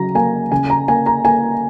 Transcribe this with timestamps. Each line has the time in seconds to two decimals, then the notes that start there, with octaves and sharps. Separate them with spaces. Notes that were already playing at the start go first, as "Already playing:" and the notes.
Already playing: C#3 F#3 A#5
0.15 A#3 G#5
0.52 C#3 G#5
0.70 A#5
0.88 A#3 G#5
1.06 A#5
1.25 A#3 G#5